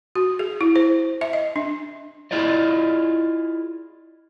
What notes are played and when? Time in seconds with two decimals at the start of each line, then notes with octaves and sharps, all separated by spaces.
0.15 F#4
0.39 G#4
0.61 E4
0.76 C5
1.21 E5
1.33 D#5
1.56 D4
2.31 E4 F4 G#4 D5 D#5